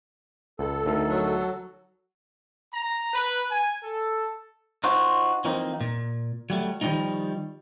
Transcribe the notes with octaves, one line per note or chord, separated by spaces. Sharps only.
C#2 A4
D2 D#4 A#4
F#3
A#5
B4
G#5
A4
D#4 F4 F#4 C5
E3 F3 A#3 C4 D#4
A#2
F#3 G3 A3
D#3 F3 G3 A#3 D4 D#4